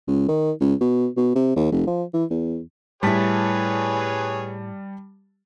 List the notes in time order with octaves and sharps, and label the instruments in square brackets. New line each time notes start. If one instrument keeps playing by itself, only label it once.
[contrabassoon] C#2
D#3
C#2
B2
B2
C3
D#2
F1
F3
E3
E2
[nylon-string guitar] A2 E4 [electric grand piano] G3 A5 B6 [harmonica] G#4 B4 C#5